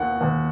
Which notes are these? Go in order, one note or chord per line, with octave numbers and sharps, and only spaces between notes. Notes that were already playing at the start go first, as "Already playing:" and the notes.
Already playing: D#2 D#3 F#5
D#2